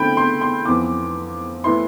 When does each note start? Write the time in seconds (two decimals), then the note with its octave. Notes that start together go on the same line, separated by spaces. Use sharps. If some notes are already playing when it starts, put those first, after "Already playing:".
Already playing: D3 A3 C4 E4 G5 B5
0.17 C6
0.41 C6
0.66 F2 E3 B3 D6
1.64 A2 E3 B3 E4 C6